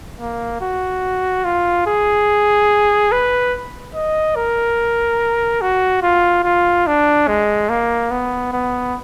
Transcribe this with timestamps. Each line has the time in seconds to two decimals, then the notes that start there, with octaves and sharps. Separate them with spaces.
0.20 A#3
0.61 F#4
1.44 F4
1.87 G#4
3.12 B4
3.95 D#5
4.36 A#4
5.61 F#4
6.03 F4
6.44 F4
6.86 D4
7.28 G#3
7.69 A#3
8.11 B3
8.53 B3